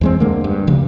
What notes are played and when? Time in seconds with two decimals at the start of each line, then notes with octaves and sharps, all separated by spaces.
0.01 E2 G#3 C4
0.20 D3 G#3 A#3
0.44 G2
0.67 D2 C#3 F3